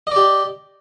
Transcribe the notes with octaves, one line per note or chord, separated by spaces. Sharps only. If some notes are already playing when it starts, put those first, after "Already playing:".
G4 D5 D#5